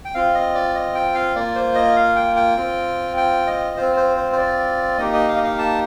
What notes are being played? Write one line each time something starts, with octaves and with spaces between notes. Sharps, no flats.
G5
C4 F4 F5
D#5
D5
D#5
G5
F5
A#3 F4 D5
C5
D#5
F5
G5
G5
C4 F4
G5
D#5
C4 F4 C5
C5
C5
C5
D5
A#3 D#4 G4 D#5
D#5
F5
D#5
F5
A5